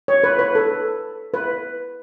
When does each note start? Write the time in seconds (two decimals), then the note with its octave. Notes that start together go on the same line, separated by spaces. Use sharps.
0.08 C#5
0.24 B4
0.39 B4
0.55 A4
1.34 B4